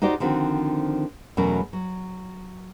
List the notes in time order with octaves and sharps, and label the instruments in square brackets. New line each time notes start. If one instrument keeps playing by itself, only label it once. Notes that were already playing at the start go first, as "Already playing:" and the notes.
[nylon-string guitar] D#4 F#4 G4 C5 D5
D3 D#3 F3 C4 F#4
E2 B2 F#3 A3 C#4 A#4
F#3